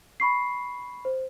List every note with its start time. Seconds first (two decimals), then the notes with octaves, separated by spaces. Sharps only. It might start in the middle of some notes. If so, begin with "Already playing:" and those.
0.20 B5 C#6 C7
1.05 C5